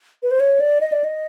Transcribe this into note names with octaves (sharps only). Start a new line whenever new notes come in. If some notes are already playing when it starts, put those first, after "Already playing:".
B4
C5
C#5
D5
D#5
D5
D#5